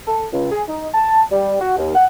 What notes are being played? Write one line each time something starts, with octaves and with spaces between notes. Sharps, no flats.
A4
C#2
G#4
D#4
A5
G3
F#4
D#2
F#5